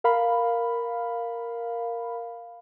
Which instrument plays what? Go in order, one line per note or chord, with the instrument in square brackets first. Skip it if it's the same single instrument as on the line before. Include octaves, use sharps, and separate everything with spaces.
[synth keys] A#4 F5 B5